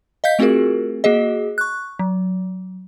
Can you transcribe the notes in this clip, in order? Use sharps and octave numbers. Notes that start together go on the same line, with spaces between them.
D#5 F5 G6 B6
A3 C4 F4 F#4 G#4 A#4
A#3 F#4 G#4 D#5
C#6 F#6
F#3